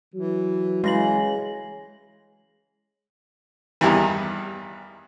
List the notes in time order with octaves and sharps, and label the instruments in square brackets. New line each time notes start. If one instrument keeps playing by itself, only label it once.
[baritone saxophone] E3 [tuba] F#3
[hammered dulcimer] C#3 [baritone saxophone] E3 [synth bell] G#3 A#6 F#7
[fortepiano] E2 G2 D#3 E3